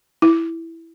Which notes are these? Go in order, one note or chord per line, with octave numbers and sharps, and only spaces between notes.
E4